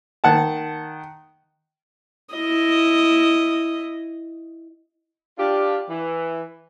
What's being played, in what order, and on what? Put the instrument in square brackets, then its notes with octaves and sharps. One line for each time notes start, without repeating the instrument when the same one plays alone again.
[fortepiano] D#3 F#5 A5
[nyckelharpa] E4 D#5
[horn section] D4 F4 G4
E3